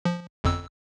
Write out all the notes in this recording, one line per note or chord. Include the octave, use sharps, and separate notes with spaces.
F3
G1 F2 E6